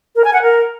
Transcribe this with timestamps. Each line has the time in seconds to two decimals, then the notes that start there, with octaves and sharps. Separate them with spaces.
0.16 A#4
0.24 G#5
0.33 F#5
0.42 A#4